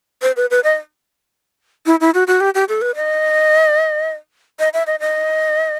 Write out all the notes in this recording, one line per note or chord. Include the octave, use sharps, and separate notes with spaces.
C5
B4
B4
D#5
E4
E4
F#4
F#4
G4
G4
A4
B4
D#5
D#5
E5
D#5
D#5